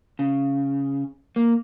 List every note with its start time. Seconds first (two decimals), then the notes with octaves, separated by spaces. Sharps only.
0.19 C#3
1.36 A#3